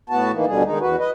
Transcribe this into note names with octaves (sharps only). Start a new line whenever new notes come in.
A2 B3 F#4 A5
D#3 E3 A#3
D2 B2 D3 G3 G#4
D#3 G#3 D#4
E2 F#4 B4
B4 D#5